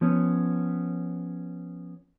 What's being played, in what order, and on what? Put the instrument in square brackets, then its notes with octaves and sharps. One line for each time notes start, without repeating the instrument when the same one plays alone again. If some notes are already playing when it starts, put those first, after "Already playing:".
[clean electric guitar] F3 B3 C#4